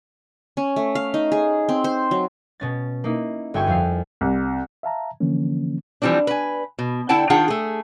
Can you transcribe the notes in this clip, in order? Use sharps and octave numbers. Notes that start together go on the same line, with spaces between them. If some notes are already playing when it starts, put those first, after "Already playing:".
C#4
A3
F5
D#4
G#4
C4
C5
F#3
B2 C#4 A6
A#3 D#4 E4
G1 F#4 E5 G5 G#5 C#6
F2 F5 C7
C2
E5 F5 A5 A#5
D3 E3 F3 A#3 C#4
E3 F3 G3 C4 D4
B4 G#5
B2
D3 E4 F#5 G5 A5
D#3 D4 F4 G#4 F#5 G5
A3 G#4